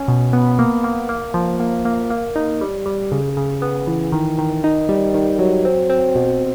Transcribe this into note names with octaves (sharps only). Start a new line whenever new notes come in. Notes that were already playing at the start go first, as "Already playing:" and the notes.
Already playing: C#4
B2
B3
A#3
A#3
A#3
F3
A#3
A#3
A#3
D#4
G3
G3
C#3
C#3
B3
E3
D#3
D#3
D#4
G3
D#3
F#3
C4
C4
B2